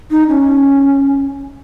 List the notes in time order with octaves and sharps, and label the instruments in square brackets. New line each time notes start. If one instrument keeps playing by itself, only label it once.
[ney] D#4
C#4